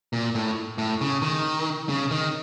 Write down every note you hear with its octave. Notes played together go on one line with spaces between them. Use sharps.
A#2
A2
A2
C#3
D#3
C#3
D#3